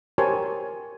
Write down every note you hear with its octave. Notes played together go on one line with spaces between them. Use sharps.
G4 A#4 C5 C#5 G#5 A5